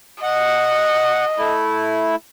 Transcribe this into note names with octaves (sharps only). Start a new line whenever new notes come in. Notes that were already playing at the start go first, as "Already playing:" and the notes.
D#5 F#5
A3 E4